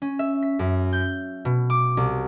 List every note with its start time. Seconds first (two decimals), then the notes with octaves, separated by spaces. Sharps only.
0.02 C#4
0.19 E5
0.42 B6
0.59 F#2
0.93 G6
1.45 B2
1.70 D6
1.97 C2